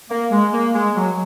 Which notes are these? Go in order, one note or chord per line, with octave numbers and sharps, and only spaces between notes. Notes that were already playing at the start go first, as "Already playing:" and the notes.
A#3
G#3
A#3
G#3
F#3